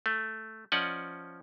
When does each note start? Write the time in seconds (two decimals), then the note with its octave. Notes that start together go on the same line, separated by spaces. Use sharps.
0.06 A3
0.72 F3 C#4 D5 D#5 F#5